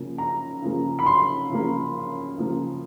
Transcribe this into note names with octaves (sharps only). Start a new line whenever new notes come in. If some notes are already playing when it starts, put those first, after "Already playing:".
Already playing: C#3 F3 A#3
A#5
C#3 F3 A#3
B5
C6
C#3 F3 A#3
C#3 F3 A#3